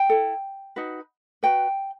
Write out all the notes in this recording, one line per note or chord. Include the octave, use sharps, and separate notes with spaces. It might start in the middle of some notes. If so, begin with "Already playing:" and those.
Already playing: G5
E4 A4
D#4 F#4 B4
F#4 B4 G5